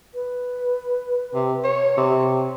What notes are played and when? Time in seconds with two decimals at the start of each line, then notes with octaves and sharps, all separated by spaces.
0.15 B4
1.34 C3
1.64 C#5
1.97 C3